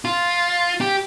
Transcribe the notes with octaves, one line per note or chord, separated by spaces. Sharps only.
F4
G4